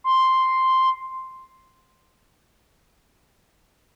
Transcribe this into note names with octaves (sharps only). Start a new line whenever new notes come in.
C6